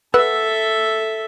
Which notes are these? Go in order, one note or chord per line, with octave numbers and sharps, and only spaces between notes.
A4 B4 E5 F#5 E6